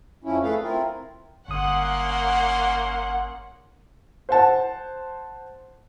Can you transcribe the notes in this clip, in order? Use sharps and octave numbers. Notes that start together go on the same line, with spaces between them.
F2 F3 C#4 E4
A3 G#4 A4 B4 F5
C4 E4 F4 A#4
G1 A#3 C#4 F#5 C6 D#6
C5 F#5 A5